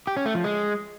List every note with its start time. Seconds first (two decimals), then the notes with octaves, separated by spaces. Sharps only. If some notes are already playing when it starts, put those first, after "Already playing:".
0.07 G4
0.17 C#4
0.26 A3
0.35 F3
0.44 G#3